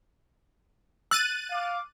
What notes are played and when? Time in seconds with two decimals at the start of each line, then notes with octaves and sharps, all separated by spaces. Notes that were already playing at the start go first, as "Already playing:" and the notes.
1.11 E6 F#6 A6 D#7
1.51 F5 D6